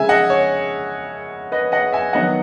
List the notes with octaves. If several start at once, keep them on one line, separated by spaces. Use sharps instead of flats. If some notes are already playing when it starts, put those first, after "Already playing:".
Already playing: C#3 G#3 E5 G#5
D#5 F#5
C#5
B4 D#5
D#5 F#5
E5 G#5
D#3 F#3 B3 D#4 D#5 F#5